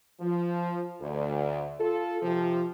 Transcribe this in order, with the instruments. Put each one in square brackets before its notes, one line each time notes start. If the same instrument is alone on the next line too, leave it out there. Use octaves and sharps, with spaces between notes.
[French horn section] F3
D2
F4 A4
C3 F3